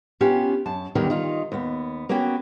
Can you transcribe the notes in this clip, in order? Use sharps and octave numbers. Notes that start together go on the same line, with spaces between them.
B3 C#4 F4 G4
F#2 A5
E2 D3 D#3 G3 A#4
D#3 D#4 F4
D#2 B3
A#3 B3 C#4 F#4 G5